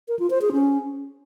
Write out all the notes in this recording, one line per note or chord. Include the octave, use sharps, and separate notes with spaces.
A#4
F4
C5
G#4
C#4